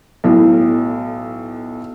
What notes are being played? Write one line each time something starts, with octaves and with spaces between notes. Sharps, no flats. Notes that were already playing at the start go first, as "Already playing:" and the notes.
B1 A2